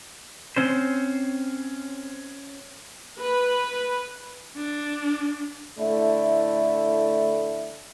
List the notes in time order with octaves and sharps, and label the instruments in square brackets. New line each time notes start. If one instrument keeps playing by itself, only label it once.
[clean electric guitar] C4 C#4 C5
[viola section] B4
[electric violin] D4
[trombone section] A2 D3 A3 E4